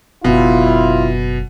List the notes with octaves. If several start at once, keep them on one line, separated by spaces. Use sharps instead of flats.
F#1 B2 E4 F4